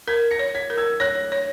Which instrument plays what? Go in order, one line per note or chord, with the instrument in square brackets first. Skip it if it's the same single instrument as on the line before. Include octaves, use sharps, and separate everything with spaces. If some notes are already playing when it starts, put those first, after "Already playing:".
[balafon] A#4 [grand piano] G#6 B6
[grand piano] A#6 C#7
[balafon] C#5
[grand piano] G#6 B6
[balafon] A#4
[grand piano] E6 G#6
[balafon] C#5 [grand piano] F#6 A#6
[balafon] C#5